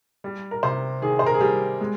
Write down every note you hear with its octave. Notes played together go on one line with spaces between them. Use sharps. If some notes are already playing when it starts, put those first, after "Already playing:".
G3
A#4
C3 C5
D#3 G#4
C5
A#4
G#4
G3 G4
G#3